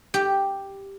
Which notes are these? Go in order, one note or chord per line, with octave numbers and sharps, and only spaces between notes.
G4